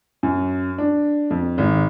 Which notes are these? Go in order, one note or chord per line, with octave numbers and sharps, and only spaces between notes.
F#2
D4
F2
G#1